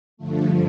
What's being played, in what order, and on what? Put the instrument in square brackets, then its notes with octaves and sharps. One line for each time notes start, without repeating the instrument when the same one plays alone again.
[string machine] G2 D3 F3 A3